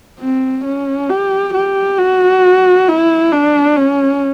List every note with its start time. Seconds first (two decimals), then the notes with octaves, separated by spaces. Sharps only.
0.20 C4
0.64 C#4
1.09 G4
1.54 G4
1.98 F#4
2.88 E4
3.32 D4
3.76 C#4